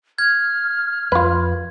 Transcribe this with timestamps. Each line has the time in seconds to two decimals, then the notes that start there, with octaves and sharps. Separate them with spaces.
0.18 F6 G#6
1.12 F2 F4 B4